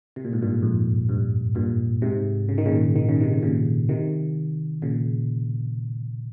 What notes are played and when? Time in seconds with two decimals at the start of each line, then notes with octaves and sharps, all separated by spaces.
0.16 C3
0.25 A#2
0.33 G#2
0.42 G2 A#2
0.62 F2 G#2
1.09 G2
1.55 G2 A#2
2.02 G#2 C3
2.49 C#3
2.58 D#3
2.66 A#2 C#3
2.96 D#3
3.09 C#3
3.20 C3 D#3
3.34 C3
3.42 A#2 C#3
3.89 C3 D#3
4.82 A#2 C#3